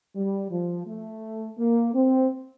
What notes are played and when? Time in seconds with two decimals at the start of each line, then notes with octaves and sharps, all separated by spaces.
0.15 G3
0.51 F3
0.87 A3
1.58 A#3
1.94 C4